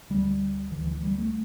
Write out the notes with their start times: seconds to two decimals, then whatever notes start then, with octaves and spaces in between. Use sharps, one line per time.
0.10 D2 D3 G3
0.71 D2 D3 E3
0.87 E3
1.03 G3
1.18 A3